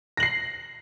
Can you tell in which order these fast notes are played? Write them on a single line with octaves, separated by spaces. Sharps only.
A#6 F#7 C7